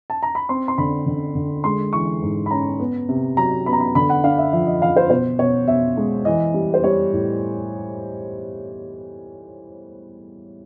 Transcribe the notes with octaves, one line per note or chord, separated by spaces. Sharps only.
A5
A#5
B5
C4 C6
C6
D3 B5
D3
D3
G#3 C6
E3 C#6
G#2
B5
C#4 A#5
B3
C3
F#3 A#5
B3 B5
A#5
B5
D3 B5
F#5
D4 F5
E5
F3 E5
D#5
F3 F5
C5
B2 C5
B2 C#5
B2 E5
G#3
E3 D#5
G3
C5
G3 C#5
A2